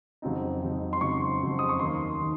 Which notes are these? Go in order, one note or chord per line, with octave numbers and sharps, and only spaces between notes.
F2 C#3 F#3 C4 D#4
F2 C#3 F#3 C4 D#4
C6
F2 C#3 F#3 C4 D#4 C#6
F2 C#3 F#3 C4 D#4
D#6
C#6
D#2 D#3 A#3 C6
D#3